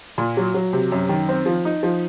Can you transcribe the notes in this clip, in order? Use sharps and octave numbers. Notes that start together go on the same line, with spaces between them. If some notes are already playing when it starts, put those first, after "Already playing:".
A#2
F#3
F#3
C3
F#2
D#3
C4
F3
D#4
F3